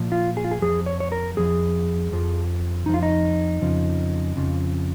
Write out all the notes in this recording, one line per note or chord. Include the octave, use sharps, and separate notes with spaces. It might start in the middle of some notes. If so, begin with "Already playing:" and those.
Already playing: A#2 F3
F4
G#4
F4
G#4
F2 F3 G#4
C#5
C#5
A#4
F2 F3 G#4
F2 F3
F2 F3 D#4
F4
D#4
F2 C#3 F3
F2 C#3 F3